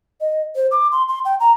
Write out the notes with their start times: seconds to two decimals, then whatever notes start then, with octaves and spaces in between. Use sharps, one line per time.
0.21 D#5
0.55 C5
0.71 D6
0.92 C6
1.09 C6
1.25 G5
1.40 A#5